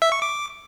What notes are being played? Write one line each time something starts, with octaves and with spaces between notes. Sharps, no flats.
E5
C#6
D6